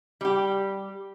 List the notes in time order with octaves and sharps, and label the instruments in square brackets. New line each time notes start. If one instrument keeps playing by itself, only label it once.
[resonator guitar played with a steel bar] G3 G4